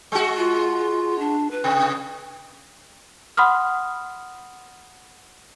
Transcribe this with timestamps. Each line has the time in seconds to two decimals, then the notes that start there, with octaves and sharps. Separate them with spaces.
0.12 G#3 F#4
0.37 F4
1.19 D4
1.51 B4
1.64 C3
3.37 F#5 B5 C6 D#6 F6